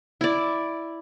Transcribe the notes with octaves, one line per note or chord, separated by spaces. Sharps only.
E4 D5